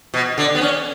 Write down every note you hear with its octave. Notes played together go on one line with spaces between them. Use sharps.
B2
D3
B3
C#4